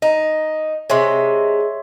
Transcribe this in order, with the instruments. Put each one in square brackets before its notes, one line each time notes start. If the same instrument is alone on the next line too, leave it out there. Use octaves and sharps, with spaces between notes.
[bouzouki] D#4 [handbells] D#5
[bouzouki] C3 G#3 [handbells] C#5 E5 C6